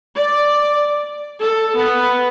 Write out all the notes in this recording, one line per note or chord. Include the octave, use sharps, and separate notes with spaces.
D5
A4
B3